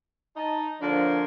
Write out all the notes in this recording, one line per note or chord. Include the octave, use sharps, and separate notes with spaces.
D#4 D#5 A5
D3 F3 A#3 D4 C5 C#5